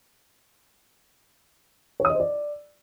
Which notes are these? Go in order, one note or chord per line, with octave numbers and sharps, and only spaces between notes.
C#5
D#6
D#5
C5
D5